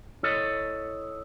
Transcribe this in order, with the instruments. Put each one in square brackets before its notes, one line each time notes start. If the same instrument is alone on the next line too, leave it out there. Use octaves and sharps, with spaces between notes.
[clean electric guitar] E4 A4 C#5 D#5